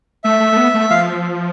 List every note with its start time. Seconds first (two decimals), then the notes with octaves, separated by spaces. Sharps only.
0.24 A3 E5
0.40 A3
0.52 A3
0.57 B3
0.74 A3
0.90 F3 F5